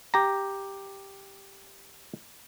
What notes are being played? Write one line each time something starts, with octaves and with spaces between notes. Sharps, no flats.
G4 A#5